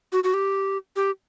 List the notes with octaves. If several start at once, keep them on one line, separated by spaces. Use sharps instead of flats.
F#4
F#4
G4
G4